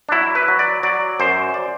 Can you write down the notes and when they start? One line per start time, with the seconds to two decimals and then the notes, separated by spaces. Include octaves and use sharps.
0.09 D4
0.12 F#3 E4
0.35 B4
0.48 F#3
0.59 D5
0.83 F#3 D5
1.20 F#2 C5
1.54 D5